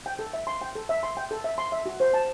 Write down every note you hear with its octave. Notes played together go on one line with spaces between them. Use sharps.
G5
A4
E5
C6
G5
A4
E5
C6
G5
A4
E5
C6
E5
F#4
C5
A5